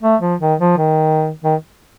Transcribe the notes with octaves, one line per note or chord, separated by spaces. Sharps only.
A3
F3
D#3
F3
D#3
D#3